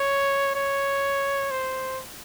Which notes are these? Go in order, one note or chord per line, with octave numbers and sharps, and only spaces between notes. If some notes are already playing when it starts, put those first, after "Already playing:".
Already playing: C#5
C#5
C5